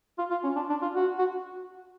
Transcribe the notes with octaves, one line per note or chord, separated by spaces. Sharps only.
F4
F4
C#4
D4
D4
F4
F#4
F#4